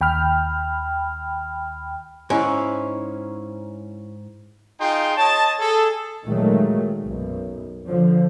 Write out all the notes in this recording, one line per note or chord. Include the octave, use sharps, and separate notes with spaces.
D#2 G5 B5 F6
G#2 C#4 E4 F5
D#4 F4 G#4 G5 C6
C#5 D#5 A5
G#4 A4
A#2 D#3 F#3 G#3 A3
B1 F#2
D3 F3